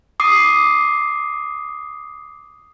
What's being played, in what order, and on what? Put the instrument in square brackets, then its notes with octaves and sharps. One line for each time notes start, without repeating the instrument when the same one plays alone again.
[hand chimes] D6 D#6 C7